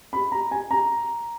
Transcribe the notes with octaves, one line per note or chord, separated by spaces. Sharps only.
B5
A#5
G#5
A#5